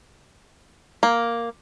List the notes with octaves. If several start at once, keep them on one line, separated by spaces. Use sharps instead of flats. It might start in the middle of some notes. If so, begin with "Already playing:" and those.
A#3